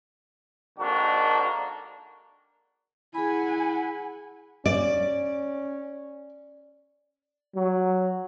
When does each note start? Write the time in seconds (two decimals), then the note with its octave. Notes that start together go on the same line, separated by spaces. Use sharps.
0.79 G#1 D#3 A#3 D4 F#4 A4
3.15 E4 G#4 F#5 G#5 B5
4.66 C#4 D5
7.56 F#3